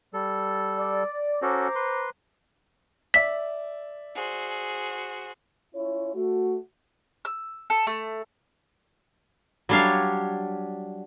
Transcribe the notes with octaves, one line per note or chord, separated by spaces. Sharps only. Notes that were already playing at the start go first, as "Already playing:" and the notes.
G3 A4
D5
C#4 F#4 A4 C5 A#5 D6
B4 C6
D5 E5 B6
F#4 G#4 C5
C#4 E4 F4 C#5
A3 F#4
E6
A4
A3
F#3 G3 D4 C#5 F5